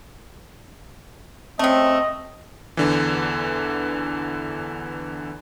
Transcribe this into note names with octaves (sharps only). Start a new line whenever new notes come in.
C#3 A3 C4 D#5
E2 D3 E3